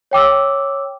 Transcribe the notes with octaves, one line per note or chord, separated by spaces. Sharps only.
C#5 G5 D6 E6